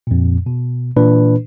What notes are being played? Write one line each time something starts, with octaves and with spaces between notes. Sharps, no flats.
F2 A#2
B2
A#2 E3 D4 B4